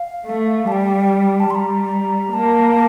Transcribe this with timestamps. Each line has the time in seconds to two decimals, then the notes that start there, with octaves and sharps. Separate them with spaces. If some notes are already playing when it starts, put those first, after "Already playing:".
Already playing: F5
0.26 A3
0.67 G3 G5 A5
1.40 A5
1.50 G3 C6
1.55 A#5
2.33 A#3 A5